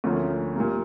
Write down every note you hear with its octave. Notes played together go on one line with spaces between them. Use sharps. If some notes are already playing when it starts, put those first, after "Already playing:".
D2 D3 F3 A#3 C#4
A#2 G3 A#3